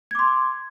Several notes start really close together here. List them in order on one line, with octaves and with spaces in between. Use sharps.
G#6 D6 C6